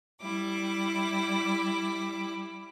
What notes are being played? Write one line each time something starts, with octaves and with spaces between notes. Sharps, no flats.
G3 E4 D6